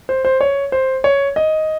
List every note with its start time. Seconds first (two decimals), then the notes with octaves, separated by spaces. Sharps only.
0.09 C5
0.25 C5
0.41 C#5
0.72 C5
1.04 C#5
1.36 D#5